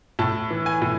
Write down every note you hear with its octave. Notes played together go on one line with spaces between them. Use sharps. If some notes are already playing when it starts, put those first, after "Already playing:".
A2 A5
E3
G#5
A2